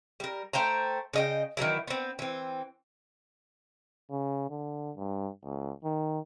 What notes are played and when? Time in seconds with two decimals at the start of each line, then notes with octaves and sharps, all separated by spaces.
0.20 G3 A#4
0.53 A3 C5 G5 A#5
1.13 C#3 D#5 G5
1.57 D#3 E3 F#3 E4
1.87 B3 C4
2.19 E3 C4
4.10 C#3
4.50 D3
4.97 G2
5.44 C#2
5.84 D#3